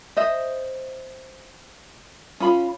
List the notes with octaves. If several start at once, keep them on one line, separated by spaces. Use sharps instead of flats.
C5 D#5 E5
C#4 F4 B5